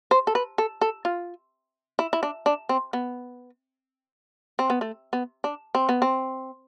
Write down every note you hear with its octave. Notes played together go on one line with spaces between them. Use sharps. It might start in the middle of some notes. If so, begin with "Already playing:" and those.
C5
A4
B4
A4
A4
F4
E4
E4
D4
D4
C4
B3
C4
B3
A3
B3
D4
C4
B3
C4